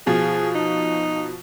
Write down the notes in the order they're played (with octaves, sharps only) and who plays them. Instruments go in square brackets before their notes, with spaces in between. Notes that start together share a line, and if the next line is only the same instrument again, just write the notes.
[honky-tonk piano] B2 F3 [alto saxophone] G#4
[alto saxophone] D#4